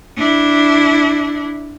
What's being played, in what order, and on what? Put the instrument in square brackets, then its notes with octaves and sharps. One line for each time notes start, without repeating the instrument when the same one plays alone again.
[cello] D4 E4